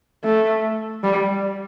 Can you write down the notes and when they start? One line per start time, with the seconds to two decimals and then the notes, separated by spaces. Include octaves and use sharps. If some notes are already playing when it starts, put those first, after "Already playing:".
0.24 A3
1.03 G3